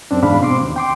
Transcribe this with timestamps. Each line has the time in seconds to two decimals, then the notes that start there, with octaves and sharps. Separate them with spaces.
0.11 F#2 C4 D4
0.23 E2 G#2 D4 F5 B5
0.40 B2 C4 C6 D6
0.61 D#2
0.76 G5 C6 D6